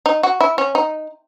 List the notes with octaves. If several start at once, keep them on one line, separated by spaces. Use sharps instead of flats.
D#4
F#4
E4
C#4
D#4